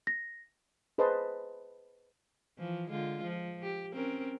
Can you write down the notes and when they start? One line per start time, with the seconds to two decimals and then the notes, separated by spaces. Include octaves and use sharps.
0.07 A#6
0.98 G#4 B4 C5 D#5 A5 C6
2.58 E3 F3
2.90 D3 G#3 F4
3.23 F3
3.62 G4
3.93 C4 C#4 A#4